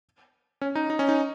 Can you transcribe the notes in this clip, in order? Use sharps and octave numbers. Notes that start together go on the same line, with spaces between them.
C#4
D#4
D#4
C#4
D#4